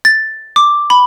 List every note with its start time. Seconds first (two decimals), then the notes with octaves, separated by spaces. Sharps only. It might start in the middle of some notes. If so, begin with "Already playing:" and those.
0.05 A6
0.56 D6
0.90 B5